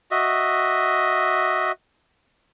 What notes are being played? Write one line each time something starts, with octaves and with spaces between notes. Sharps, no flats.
F#4 D#5 E5